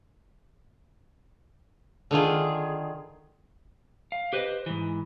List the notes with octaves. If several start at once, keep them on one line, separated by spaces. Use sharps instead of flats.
D3 D#3 F4 G#4
F5
G4 B4 C5 D#5
G#2 E3